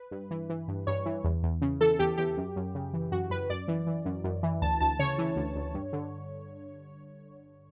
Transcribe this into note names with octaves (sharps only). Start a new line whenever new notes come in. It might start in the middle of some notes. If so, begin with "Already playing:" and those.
Already playing: B4
G2
E3
E3
G2
G2 C#5
E3
E2
E2
C#3
E3 A4
E2 G4
E2 G4
F#2
F#2
C#3
E3
F#2 F#4
F#2 B4
F#2 D5
E3
E3
F#2
F#2
E3
D2 A5
D2 A5
C#3 C#5
E3
D2
D2
G2
D3